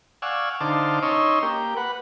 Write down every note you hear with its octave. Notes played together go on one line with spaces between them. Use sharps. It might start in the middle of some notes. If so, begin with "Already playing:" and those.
D5 F5 F#5 G#5 C#6 E6
D3 D#4 C5 F5 A5 D6
C#4 D#4 C#5 D#5 C6 E6
A#3 G4
B4 F#5